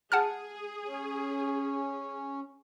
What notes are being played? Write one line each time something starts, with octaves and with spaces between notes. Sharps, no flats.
G#4 F#5 A5 F6
C#4